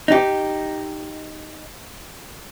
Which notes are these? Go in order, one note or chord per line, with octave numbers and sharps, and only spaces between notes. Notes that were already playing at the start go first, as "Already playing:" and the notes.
D#4 G4